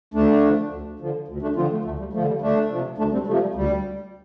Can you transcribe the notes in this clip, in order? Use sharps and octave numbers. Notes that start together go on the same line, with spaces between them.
D2 A3 D4
D3 F3
D2
D3 F3
D2
A3 D4
D3 F3 C4 F4
A3
D2 A3
G3
D3 F3 A3
G3
D2 A3 D4
C3 F3
D2 A3 D4
G3 C4
C3 F3 A3
G3
D2 G3